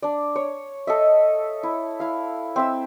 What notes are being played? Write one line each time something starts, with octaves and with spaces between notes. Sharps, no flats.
D4 D5
C#5
A4 D#5 E5
E4
E4 F5
C4 E5 E6